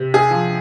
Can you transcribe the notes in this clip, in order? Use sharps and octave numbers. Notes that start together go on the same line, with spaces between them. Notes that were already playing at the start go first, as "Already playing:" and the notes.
Already playing: C3
G#4
F3